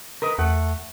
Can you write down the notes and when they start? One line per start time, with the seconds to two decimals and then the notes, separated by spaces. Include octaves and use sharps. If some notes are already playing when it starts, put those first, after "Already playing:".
0.22 A#4 B4 D#5
0.38 E2 A3 F#5